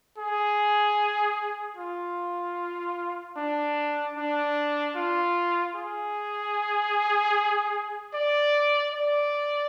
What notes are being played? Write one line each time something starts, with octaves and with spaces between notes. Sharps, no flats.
G#4
F4
D4
D4
F4
G#4
D5
D5